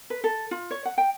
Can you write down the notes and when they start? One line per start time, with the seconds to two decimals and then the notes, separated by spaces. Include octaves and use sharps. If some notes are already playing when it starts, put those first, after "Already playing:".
0.10 B4
0.24 A4
0.51 F4
0.71 C#5
0.85 F#5
0.98 G5